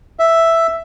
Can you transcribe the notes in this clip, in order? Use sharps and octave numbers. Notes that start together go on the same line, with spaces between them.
E5